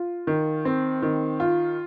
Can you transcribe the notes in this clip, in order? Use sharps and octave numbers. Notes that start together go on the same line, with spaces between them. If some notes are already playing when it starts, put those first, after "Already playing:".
Already playing: F4
D#3
C4
D#3
F4